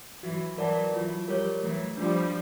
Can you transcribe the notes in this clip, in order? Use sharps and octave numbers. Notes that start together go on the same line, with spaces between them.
E3 F#3 F#4
E3 F#3 A#4 D5 F#5 A5
E3 F#3 F4
F3 G3 A#4 C#5
E3 F#3 A3
F3 G3 D4 G4